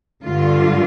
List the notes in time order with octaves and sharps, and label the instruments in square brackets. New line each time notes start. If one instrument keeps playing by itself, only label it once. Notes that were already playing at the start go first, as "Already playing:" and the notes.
[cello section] G2 D3 F4